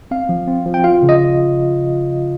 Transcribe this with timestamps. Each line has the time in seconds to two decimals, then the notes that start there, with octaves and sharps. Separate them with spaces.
0.11 C4 F5
0.29 F3
0.47 C4
0.66 F3
0.74 G5
0.84 F4 F5
1.02 C#3
1.09 D#5